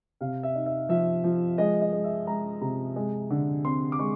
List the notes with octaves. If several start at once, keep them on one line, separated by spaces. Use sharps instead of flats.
C3 F5
E5
D#4
E5
F3 E5
F3
G#3 D#5
D#5
G#3
E5
G#3 A#5
C3 A#5
G#3
D3
C4 C6
D6
G#3 C#6